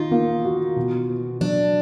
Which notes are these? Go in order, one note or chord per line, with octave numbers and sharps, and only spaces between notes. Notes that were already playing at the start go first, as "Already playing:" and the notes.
Already playing: D#3 D#4 F4
A#3
F#4
B2
B3
F#3 D4